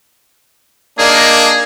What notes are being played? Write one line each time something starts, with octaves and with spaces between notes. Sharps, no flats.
A#3 D4 D#4 G#4